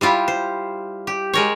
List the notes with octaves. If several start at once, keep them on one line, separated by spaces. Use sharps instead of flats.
G3 E4 F4 G4
C5
G4
G#3 A#4 C#5